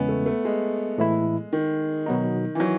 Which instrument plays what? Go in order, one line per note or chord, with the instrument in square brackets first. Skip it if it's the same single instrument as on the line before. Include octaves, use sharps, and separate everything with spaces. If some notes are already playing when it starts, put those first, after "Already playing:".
Already playing: [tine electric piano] E2 C#3 G#3 C#4 [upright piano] B3
[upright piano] A3
A3
G#3
[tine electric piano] A2 E3 A3 E4
[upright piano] D#3
[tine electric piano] B2 F#3 B3 D#4
[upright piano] E3
F#3